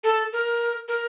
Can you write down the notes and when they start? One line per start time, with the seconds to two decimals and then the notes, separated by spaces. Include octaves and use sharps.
0.04 A4
0.33 A#4
0.88 A#4